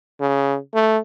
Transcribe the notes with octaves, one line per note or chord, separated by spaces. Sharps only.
C#3
A3